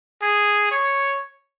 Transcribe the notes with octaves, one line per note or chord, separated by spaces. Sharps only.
G#4
C#5